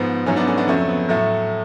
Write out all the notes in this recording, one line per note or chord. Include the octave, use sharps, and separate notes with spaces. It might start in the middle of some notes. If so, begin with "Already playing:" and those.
Already playing: G#2 F3 B3
G#2 F#3 A3 C#4
B3 D4
A3 C#4
B3 D4
F2 C#3 F#3 A3 C#4
B3
A2 F#3 A3